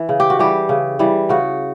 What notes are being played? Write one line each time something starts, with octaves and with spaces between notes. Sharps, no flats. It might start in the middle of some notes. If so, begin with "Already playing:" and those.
Already playing: E3
C#3
G4
F#4
E3 G3 G4
C#3
E3 G3
C#3 F#4